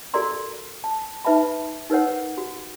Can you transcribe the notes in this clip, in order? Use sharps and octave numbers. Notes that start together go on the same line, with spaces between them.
F#4 A4 A#4 D5 A#5 C6
A5
D#4 B4 E5 A5 B5
D#4 A#4 B4 C#5 F#5
F#4